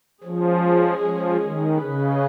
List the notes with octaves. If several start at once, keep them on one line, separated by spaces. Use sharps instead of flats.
F3 G#3 C#4 G#4
F3
D#3
C#3 C#4 G#4 B4 D#5